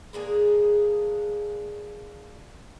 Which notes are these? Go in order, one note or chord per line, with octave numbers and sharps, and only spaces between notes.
G#3 A#3 D4 G#4